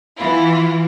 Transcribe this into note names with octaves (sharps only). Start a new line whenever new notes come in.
E3 B3 E4 F4